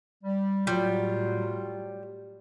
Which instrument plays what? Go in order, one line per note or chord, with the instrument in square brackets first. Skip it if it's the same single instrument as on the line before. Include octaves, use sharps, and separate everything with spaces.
[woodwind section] G3
[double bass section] A2 F#3 [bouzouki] G3 [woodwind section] F4